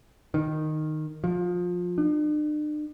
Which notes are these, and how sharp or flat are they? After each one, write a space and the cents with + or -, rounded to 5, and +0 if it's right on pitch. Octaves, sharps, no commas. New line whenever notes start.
D#3 -10
F3 +25
D4 +45